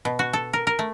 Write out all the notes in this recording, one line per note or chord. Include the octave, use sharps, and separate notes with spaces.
B2
F#4
A4
A#4
A#4
A3